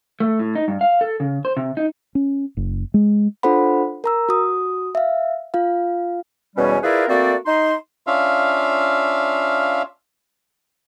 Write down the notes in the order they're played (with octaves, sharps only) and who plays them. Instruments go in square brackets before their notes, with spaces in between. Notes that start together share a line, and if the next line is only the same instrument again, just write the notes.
[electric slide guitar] A3
A2
D#4
G2
F5
A4
C#3
C5
C3
D#4
[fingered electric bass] C#4
F#1
G#3
[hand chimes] D4 F4 A4 C5 F#5 B5
A#4 A#5 E6
F#4 D#6
E5 F5
F4 F5
[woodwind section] E2 B2 G3 C#4
E4 F4 G#4 A#4 B4 D5
A3 A#3 C4 F#4 D5
D#4 C6
[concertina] C#4 D4 F4 E5 F5